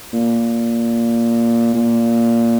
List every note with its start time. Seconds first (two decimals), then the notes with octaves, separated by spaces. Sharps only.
0.13 A#2
1.74 A#2